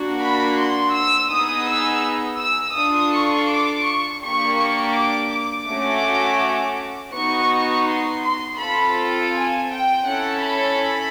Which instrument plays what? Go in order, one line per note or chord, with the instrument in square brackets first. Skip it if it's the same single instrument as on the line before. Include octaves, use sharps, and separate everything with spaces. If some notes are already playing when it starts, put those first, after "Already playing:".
Already playing: [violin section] A#3 D4 F#4
B5
C6
E6
B3 D#4 G#4 D#6
E6
E6
D4 F4 A4 D#6
C#6
D6
C#6
A#3 D4 G4 C#6
C#6
D6
D6
A3 C#4 F#4
B3 D#4 F#4 C#6
C6
C6
C4 F4 A4 B5
G#5
G5
C#4 E4 A4 F#5
B5